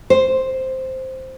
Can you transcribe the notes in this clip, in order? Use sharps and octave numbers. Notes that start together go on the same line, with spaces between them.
C5